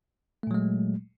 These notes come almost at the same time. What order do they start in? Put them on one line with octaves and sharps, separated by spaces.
A3 A#2 F#3 G#3